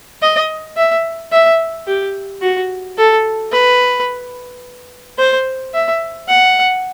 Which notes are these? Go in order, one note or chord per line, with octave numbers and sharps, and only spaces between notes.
D#5
E5
E5
G4
F#4
A4
B4
C5
E5
F#5